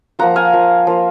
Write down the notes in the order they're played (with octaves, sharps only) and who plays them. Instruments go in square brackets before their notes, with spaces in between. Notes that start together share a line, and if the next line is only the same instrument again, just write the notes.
[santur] F3 A#3 F4 F#5 A#5
F5 G#5
F3 A#3 F4
F3 A#3 F4